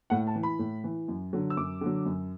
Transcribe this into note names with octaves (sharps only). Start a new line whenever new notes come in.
A2 F#5
A5
E3
B5
A2
E3
F#2
D3 F#3
E6
F#2 D6
D3 F#3
F#2